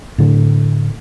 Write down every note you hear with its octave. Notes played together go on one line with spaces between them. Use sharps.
A2 D3